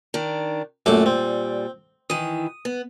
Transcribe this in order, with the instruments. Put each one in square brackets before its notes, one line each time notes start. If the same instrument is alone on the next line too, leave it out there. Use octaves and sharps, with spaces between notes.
[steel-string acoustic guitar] D#3 D4
[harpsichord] F#2 A3 D6 [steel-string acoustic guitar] A#2 G3
[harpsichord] C4
[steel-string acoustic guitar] D#3 E3 [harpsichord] D#6
[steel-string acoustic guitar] B3